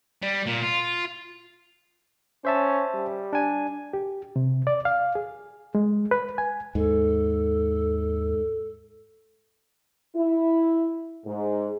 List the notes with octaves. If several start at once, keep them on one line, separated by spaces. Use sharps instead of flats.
G3
A#2
F4
C#4 C5 E5 A5
G3
D4 G#5
G4
C3
D5
F5
G#4
G#3
B4
G#5
D#2 G#2 A4
E4
G#2